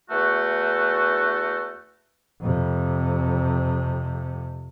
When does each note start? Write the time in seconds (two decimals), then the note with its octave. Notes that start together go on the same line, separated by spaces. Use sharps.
0.10 E2 E3 A3 F#4
2.41 F2 C3